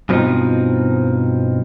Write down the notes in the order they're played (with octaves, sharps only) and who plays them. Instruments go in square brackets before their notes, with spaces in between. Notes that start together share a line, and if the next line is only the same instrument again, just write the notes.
[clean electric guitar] G2 B2 F3 A3 C4 D#4